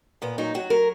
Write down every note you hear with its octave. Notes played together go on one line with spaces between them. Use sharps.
A#2 B3
F#3 D#4
F#3 F#4
F#3 A#4